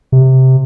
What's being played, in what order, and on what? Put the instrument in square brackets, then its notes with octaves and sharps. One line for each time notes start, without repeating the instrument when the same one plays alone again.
[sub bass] C3